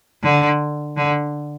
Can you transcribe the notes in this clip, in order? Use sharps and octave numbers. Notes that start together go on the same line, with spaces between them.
D3
D3